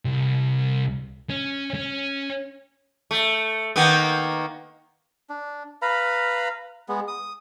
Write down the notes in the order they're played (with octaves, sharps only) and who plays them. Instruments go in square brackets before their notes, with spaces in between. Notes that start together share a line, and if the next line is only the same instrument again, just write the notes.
[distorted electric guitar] C2
C#4
C#4
[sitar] A3
D#3 A#3 B3
[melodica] D4
B4 F5 A#5 B5
G#3 B3
D#6